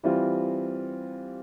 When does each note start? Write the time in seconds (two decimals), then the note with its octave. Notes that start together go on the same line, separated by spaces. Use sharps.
0.03 E3 G3 C4 F4